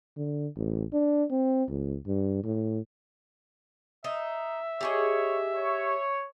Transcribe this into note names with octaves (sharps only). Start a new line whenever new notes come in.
D3
A1
D4
C4
C#2
G2
A2
D#4 E5
G4 G#4 C#5 D#5
C#5